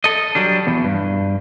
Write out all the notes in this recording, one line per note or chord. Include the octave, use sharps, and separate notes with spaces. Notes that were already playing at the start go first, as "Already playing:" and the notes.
A4 D#5
F#3 G3 D4
E2 B2
G2